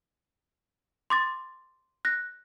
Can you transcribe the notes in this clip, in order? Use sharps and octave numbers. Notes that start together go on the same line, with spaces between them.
C6 D6 A6
F#6 A#6